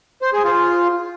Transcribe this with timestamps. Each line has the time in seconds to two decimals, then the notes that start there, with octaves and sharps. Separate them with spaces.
0.22 C5
0.33 G#4
0.44 F4